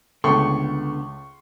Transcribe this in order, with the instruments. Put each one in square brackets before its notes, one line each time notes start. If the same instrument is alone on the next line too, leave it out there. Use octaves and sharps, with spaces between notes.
[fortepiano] C#2 A3 [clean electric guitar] D3 B3 G5 [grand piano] C6 C#6